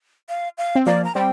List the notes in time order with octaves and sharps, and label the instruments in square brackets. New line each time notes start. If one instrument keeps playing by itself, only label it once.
[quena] F5
F5
[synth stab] C4
[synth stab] F3 A#3 [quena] D5
[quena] A#5
[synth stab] G3 C4 [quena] G5